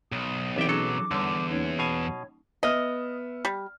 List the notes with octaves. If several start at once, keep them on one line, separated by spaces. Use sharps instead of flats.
B1 D#6
C2 E3 C4 D#4 E5 G5 D6
F#3 C#4 G#4 A4
E2 D3 G3 C#5 C6
A#3 C#4 D#4 C#5
B2 F5 G#5
B3 D#5 E5 F6
G3